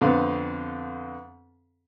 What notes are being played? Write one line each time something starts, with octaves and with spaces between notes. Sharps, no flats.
F2 D3 B3 C4 F5